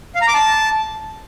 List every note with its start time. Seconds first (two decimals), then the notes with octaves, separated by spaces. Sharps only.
0.15 F5
0.21 A#5
0.28 D6
0.34 A5